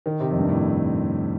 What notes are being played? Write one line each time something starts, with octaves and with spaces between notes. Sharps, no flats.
D#3
C3
F2
G2
A2